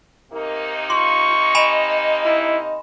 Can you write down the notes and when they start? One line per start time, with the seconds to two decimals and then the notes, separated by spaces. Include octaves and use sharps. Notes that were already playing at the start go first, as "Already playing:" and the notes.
0.32 C3 A#3 D#4 A#4
0.90 F4 C6 C#6
1.55 D#5 G#5 B5 E7
2.25 E4